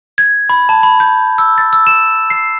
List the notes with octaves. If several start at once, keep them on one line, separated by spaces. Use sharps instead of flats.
G#6
B5
A5
B5
G6
E6
A6
E6
E7
C7